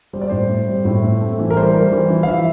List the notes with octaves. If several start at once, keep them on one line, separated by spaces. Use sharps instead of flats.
G3 C5
D5
A2 C5
C4
G3
A2
C4
A3
E3
A#4
G3 C5
G3
E3
E3
F5
F3 E5